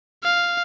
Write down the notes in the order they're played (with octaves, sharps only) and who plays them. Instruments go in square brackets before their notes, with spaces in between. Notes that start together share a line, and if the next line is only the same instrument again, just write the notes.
[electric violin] F5